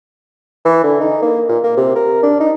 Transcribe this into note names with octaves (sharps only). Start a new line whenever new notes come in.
E3
D3
D#4
A#3
A#2
A#3
C3
A#4
D4
D#4